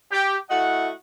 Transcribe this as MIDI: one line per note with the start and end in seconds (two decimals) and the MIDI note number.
0.12 0.36 67
0.50 0.91 57
0.50 0.91 64
0.50 0.91 66
0.50 0.91 75
0.50 0.91 78